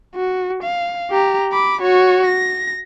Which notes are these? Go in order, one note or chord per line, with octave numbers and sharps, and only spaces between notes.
F#4
F5
G4 A#5
B5 D6
F#4 C#5
A#6